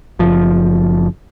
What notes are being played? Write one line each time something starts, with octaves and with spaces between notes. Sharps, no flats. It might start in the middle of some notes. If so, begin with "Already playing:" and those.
F#1 F3